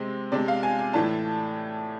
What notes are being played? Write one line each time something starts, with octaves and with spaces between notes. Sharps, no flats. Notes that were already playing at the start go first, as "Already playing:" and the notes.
Already playing: C3 G#3 C4
C3 G#3 D4 D5
F5
G#5
G#5
A2 E3 A3 D4 A5